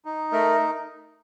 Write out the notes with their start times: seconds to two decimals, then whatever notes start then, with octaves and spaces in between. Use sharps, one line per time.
0.05 D#4
0.32 A3 A#4